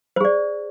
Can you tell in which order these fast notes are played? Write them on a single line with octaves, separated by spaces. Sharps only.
C5 G#4 D5